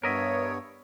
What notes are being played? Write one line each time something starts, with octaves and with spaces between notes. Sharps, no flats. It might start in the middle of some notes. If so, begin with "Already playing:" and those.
G2 B3 A#4 C#5 D#5 E5